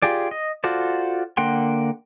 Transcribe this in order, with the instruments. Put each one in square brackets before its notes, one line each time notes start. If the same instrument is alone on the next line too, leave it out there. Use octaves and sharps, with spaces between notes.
[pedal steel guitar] F4 G4 G#4 D5
D#5
F4 F#4 A4 C5 D5
D3 A#3 F#5 G5 C6